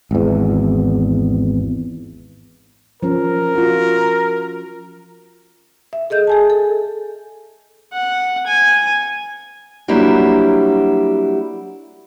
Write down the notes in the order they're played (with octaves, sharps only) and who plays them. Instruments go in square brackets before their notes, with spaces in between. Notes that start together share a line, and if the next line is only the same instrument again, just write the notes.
[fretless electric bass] G#1 E2
[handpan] F3 C#4 [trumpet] A#4
[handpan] F4 F#4
[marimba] E5
G#4 A4 D#5 G6
G#4 G#5 A5
A4
[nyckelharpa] F#5
G#5
[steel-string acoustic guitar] F#3 G3 A#3 D4 E4 F#4